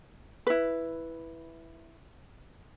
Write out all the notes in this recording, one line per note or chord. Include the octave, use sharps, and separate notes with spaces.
E4 B4